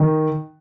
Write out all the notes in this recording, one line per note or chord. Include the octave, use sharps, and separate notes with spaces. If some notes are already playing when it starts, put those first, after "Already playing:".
Already playing: D#3